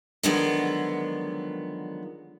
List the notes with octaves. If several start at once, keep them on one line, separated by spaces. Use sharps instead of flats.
D3 D#3 F3 F#3 G#3 B3